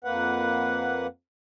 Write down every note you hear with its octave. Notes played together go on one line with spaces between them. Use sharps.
F2 A#3 B4 F#5